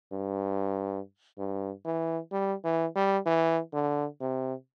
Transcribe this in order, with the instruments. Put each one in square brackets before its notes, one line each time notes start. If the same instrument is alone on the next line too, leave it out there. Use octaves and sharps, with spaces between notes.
[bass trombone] G2
G2
E3
G3
E3
G3
E3
D3
C3